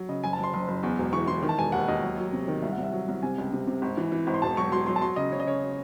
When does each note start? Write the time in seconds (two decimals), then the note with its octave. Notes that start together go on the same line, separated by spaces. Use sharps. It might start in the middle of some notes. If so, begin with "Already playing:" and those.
Already playing: F#3
0.09 C#3 D#5
0.24 F#1 G#5
0.33 A5
0.38 F#1
0.43 C6
0.53 F#1 C6
0.68 F#1
0.83 E2
0.98 E1
1.13 E3 C#6
1.28 E3 C6
1.43 D#3
1.49 A5
1.58 E1 G#5
1.72 D#2 F#5
1.88 D#2 D#5
2.02 F#3
2.18 F#3
2.33 C3
2.48 D#3
2.62 C2 E5
2.73 F#5
2.78 C2
2.83 E5
2.92 F#3
3.08 C2
3.23 C3 G#5
3.38 C#2
3.53 C3
3.67 C3
3.82 G#1
3.97 E3
4.12 E3
4.27 G#1
4.34 C6
4.42 E1 A5
4.57 F#3 C#6
4.71 F#3 C6
4.86 F#3 C6
4.96 A5
5.01 F#3 C6
5.16 C#3 D#5
5.32 C#3 C#5
5.40 D#5
5.47 C#3 C#5